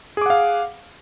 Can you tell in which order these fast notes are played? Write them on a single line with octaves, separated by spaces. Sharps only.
G#4 D6 F#5 F5